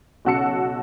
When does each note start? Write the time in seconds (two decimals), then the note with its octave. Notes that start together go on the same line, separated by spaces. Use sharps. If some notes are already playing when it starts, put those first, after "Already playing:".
0.25 B1 C#3 F#4 A5 E6 C#7